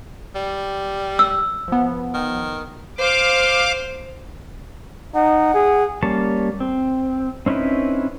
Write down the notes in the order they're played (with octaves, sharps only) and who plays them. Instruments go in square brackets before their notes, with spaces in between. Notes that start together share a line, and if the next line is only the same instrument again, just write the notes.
[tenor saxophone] G3
[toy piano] E6
[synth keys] F3 B3
[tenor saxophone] D#3
[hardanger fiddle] C5 [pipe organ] F5 D6
[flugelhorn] D#4 [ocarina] F#5
[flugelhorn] G#4
[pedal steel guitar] G3 A#3 C#4 C#5 A5
C4
C4 C#4 D#4 E4 B4